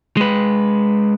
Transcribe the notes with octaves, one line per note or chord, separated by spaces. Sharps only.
G#3 B4